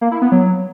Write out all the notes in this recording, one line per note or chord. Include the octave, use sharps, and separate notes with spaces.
A#3
E4
B3
F#3